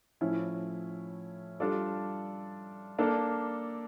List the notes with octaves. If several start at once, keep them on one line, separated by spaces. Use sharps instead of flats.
A2 F3 C#4 E4
G3 D4 F4 A4 D5
A#3 D4 A4